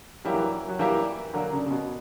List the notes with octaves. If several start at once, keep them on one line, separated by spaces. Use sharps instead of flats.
F#3 G3 A#3 E4 G4 A#4
E3
F#3
F#3
E3 G3 A#3 E4 G4 A#4
D3 F#3 A#3 D4 A#4
C#3
C#3
B2